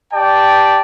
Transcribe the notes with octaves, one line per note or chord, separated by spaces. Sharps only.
G4 D5 G5 A5